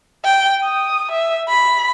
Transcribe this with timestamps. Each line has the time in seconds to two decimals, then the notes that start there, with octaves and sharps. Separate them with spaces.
0.24 G5
0.63 D#6
1.12 E5
1.49 B5